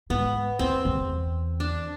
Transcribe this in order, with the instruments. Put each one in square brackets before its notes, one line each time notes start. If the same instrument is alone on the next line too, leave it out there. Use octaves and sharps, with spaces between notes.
[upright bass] G#2 [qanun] B3
[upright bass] E2 [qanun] C4
[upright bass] E2
[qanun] D4